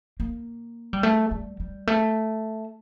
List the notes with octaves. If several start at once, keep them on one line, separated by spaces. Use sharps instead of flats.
A#3
G3
A3
G3
G3
A3